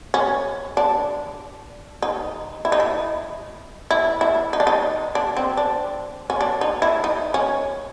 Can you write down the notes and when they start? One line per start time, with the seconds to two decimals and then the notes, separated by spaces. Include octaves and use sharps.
0.14 C#4
0.77 D4
2.02 D#4
2.65 E4
2.72 D#4
2.80 E4
3.91 E4
4.21 E4
4.53 D#4
4.60 D4
4.67 D#4
5.15 D4
5.37 C4
5.57 D4
6.30 C#4
6.41 D4
6.61 D#4
6.82 E4
7.04 D#4
7.34 C#4